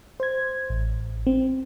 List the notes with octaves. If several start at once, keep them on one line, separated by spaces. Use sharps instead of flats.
C5 G#6
A1
C4